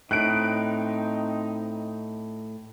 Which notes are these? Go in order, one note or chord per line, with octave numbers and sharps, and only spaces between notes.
A2 C4 D#4 F#6 D7